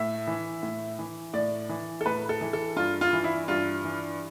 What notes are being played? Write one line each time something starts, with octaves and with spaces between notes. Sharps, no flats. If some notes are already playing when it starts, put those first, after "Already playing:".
Already playing: A2 E5
E3
A2
E3
A2 D5
E3
A4
A2 B4
A4
E3
A4
G2 F4
F4
E3
E4
G2 F4
E3